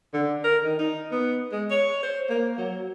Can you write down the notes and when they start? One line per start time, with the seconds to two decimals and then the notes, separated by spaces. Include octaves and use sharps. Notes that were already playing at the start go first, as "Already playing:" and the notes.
0.13 D3
0.44 A#4
0.64 D#3
0.79 D#4
1.11 B3
1.51 G#3
1.70 C#5
2.03 C5
2.30 A#3
2.57 F#3